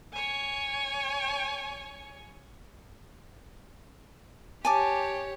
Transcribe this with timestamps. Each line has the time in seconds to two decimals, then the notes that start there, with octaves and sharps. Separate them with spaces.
0.13 C#5 G#5
4.65 G4 C#5 G#5 A5 D6